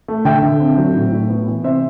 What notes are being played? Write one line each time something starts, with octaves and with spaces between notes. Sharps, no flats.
A3
D3 E5 G5
D3
C4
F#3
A2
A2
B3
E3
C3 C5 E5